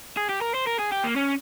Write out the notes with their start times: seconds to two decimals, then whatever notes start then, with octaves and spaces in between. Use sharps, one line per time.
0.17 G#4
0.29 G4
0.41 A#4
0.54 C5
0.67 A#4
0.79 G#4
0.92 G4
1.04 A#3
1.16 C#4